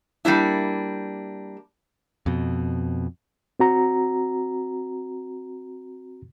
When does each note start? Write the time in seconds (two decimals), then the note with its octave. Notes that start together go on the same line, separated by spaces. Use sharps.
0.25 G3 A#3 D4 E4
2.26 F2 B2
3.59 C4 F#4 A#5